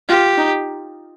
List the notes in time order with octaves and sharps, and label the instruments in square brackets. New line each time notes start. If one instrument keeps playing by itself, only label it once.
[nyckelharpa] F4 [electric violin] G4
[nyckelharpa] D#4